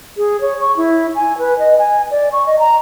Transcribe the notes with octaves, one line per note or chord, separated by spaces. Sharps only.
G#4
C#5
C#6
E4
G#5
B4
D#5
G#5
D5
C#6
D#5
A#5